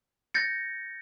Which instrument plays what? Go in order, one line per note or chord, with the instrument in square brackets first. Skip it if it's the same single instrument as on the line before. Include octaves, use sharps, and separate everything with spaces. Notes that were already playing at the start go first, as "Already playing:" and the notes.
[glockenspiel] G6 A6 A#6 C#7